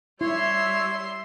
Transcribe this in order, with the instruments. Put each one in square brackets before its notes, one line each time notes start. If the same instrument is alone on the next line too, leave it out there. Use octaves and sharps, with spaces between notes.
[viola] G3 E5 [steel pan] E4 [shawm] C#5 [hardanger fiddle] C6